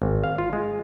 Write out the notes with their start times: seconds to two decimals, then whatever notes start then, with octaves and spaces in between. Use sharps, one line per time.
0.02 G#1
0.24 F5
0.38 F4
0.53 G#3